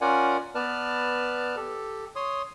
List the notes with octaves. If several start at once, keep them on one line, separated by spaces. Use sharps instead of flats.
C#4 F4 A#4 D5 F#5 G#5
B3 B4 D5 A5 F6
G4 A4
C#5 C6 D#6